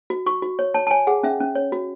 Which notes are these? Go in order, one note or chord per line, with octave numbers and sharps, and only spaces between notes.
F#4
F#4 C#6
F#4
C#5
C#5 A5
A5
C#5 G#5
G#4 F#5
C#4 E5
C#4
C#5
F#4